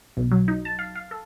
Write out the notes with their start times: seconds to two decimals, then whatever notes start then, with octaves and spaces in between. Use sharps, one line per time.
0.17 B1
0.31 F#3
0.48 D#4
0.65 A5
0.79 F5
0.95 F5
1.11 A4